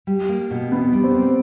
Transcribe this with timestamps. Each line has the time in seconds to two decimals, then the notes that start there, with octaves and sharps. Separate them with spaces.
0.07 G3
0.29 A#3
0.51 B2
0.71 E2 B3
0.93 G3
1.04 C4
1.15 A#3